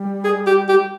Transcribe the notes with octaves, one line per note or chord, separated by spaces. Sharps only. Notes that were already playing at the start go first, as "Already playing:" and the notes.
Already playing: G3
G#4
G4
G4